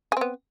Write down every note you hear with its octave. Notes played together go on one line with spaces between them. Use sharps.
B3 C4 G#4